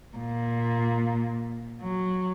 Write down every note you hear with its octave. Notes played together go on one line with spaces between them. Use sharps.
A#2
F#3